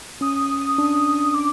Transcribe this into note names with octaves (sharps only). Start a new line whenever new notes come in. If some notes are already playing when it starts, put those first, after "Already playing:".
C#4 D#6
D4
D6